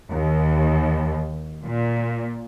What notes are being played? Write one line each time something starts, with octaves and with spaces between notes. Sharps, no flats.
D#2
A#2